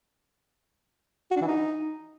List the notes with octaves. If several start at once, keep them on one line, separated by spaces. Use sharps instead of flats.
F#4
D4
E3
D#4